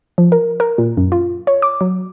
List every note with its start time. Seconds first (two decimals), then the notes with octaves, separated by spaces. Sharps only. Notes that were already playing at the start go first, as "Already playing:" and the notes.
0.18 F3
0.32 A#4
0.60 A#4
0.78 A#2
0.97 F#2
1.12 F4
1.47 C#5
1.62 D6
1.81 F#3